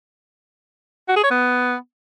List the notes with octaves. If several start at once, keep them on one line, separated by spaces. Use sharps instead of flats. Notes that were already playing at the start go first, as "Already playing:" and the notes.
F#4
G#4
C#5
B3